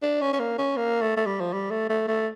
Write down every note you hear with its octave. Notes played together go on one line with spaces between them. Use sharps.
D4
C#4
C#4
A#3
C#4
A#3
A3
A3
G3
F3
G3
A3
A3
A3